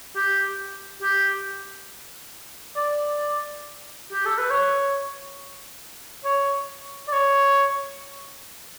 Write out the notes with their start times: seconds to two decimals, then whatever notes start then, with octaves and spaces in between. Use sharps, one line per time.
0.16 G4
1.02 G4
2.76 D5
4.12 G4
4.25 A4
4.38 B4
4.51 C#5
6.25 C#5
7.08 D5
7.13 C#5